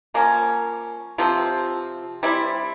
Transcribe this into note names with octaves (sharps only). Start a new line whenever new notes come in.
F3 A#3 C#4
C3 F3 C4
G3 C4 E4